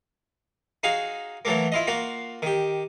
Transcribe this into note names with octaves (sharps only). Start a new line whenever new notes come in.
D#4 F#4 G#4 F5
E3 F#3 A3 A#3
E4 F4 D#5
A#3 F4 F#4
D#3 G4